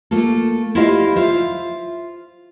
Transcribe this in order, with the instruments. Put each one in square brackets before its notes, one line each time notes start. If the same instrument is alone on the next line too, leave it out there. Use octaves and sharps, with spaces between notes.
[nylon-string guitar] A3 A#3 F4 A4
E4 F4 G4 C5 D#5 F5
F4 C5 E5